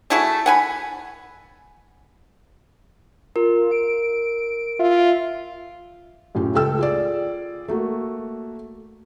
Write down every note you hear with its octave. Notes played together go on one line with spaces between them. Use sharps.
A3 E4 F#4 G#4
F#5 G#5 B5
F4 A#4
D7
F4 E5
F#2 A2 F4 G4
C#2 A4 G5 E6
F4 G#4 D5
A3 A#3 F#4